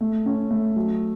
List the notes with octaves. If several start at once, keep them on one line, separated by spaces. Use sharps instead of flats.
A3
C#4
A3
F#3